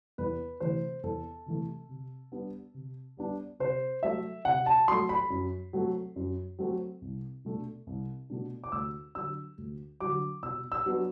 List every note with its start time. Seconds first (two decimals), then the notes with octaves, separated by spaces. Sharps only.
0.18 E2 B4
0.60 C3 E3 A3 C5
1.03 E2 A4
1.46 C3 E3 A3
1.89 C3
2.32 G3 B3 D4
2.74 C3
3.17 G3 B3 D4
3.59 C3 C5
4.03 F#3 A3 E5
4.45 C3 F#5
4.66 A5
4.88 F#3 A3 C6
5.09 B5
5.30 F#2
5.73 F#3 A3 C4
6.16 F#2
6.59 F#3 A3 C4
7.02 C2
7.45 B2 A3 D4
7.87 C2
8.30 B2 A3 D4
8.64 D6
8.72 D2 E6
9.15 D3 F#3 E6
9.58 D2
10.00 D3 F#3 D6
10.43 B2 E6
10.72 E6
10.86 F#3 B3 D4